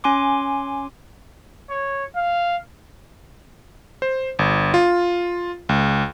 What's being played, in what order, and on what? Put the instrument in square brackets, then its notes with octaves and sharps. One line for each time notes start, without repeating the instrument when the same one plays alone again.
[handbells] C#4 G#5 C6 D6
[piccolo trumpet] C#5
F5
[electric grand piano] C5
G1
F4
C#2